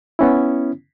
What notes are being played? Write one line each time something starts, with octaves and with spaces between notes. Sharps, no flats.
B3 C#4 E4